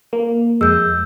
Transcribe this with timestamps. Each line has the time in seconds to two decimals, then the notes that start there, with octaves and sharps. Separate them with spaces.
0.13 A#3
0.61 F2 G#3 E6 G6